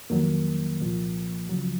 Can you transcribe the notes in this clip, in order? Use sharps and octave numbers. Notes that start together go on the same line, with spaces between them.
F2 D#3 F#3 A#3
C2 A#2 F3
C#2 C#3 F3 F#3